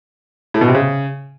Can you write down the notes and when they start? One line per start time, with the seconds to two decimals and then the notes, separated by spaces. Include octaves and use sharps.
0.54 A2
0.61 B2
0.68 C3
0.75 C#3